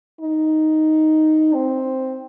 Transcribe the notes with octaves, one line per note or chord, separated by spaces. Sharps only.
D#4
C4